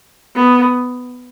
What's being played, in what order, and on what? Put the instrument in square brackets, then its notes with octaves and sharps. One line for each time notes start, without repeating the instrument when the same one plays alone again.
[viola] B3